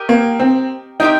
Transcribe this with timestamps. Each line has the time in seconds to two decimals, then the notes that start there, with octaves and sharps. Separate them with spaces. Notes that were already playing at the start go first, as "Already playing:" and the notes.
Already playing: G4 A#4 D#5 G5
0.09 A#3
0.40 C4
1.00 C4 D#4 G4 A#4 G5